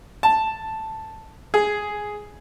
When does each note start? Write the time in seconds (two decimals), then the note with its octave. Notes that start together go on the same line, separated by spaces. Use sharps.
0.23 A5
1.54 G#4